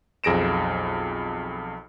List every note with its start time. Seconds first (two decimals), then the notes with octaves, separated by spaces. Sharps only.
0.24 B1 F2 G#4 A#6 D7 E7